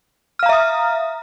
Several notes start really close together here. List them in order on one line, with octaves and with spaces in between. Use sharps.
F6 F5 A#5 E5 D#6